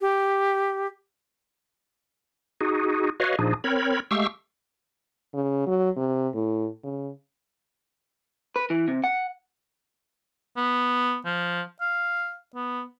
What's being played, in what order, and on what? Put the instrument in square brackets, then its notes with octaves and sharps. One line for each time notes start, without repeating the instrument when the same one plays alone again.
[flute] G4
[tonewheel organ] D#4 F#4 G#4
F#4 B4 C#5 D#5 F5
A#2 F3 D4 D#4 G#4
C4 A#4 C#5 B5
G#3 A3 G4 F5 C#6 E6
[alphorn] C#3
F#3
C3
A2
C#3
[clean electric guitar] B4
E3
C3
F#5
[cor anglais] B3
F3
F5
B3